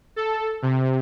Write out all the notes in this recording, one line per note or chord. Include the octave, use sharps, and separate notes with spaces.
A4
C3